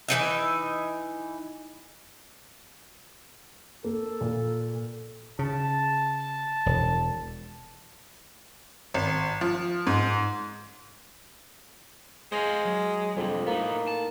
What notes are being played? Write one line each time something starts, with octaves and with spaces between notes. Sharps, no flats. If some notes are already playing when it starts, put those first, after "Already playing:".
E3 G#3 D#4 E5
A#3 A4
A#2
C#3 A5
E1
G#1
F3
G#2
G#3 C5 D#5 F5
F#3
F2 G3 C4 D4
A2 A#3 B3 D#4
A5